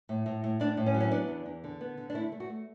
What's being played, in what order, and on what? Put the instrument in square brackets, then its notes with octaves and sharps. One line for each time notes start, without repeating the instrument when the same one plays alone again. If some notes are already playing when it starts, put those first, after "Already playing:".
[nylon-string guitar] A2
A2
A2
A2 D4
A2
C#4
F#3
C#4
B3 D4
E2
E2
D3
B3
D3
D4
A3 E4
A3
F#4
A3